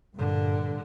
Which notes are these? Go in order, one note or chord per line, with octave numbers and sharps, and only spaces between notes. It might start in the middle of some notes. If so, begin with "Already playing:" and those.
G2 A#2 D3